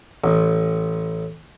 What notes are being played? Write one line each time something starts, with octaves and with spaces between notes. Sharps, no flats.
A1